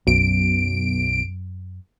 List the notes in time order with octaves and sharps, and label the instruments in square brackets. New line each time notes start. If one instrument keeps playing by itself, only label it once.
[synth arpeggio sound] B1 D7 [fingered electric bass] F#2